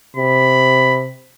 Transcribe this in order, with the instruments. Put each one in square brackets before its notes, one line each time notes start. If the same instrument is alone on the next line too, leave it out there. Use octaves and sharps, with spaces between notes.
[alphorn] C3 [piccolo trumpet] B5